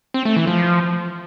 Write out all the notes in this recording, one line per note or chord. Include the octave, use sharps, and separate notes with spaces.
C4
A3
E3
F3